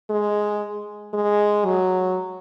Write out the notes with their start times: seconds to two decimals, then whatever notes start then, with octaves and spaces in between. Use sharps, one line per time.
0.10 G#3
1.13 G#3
1.65 F#3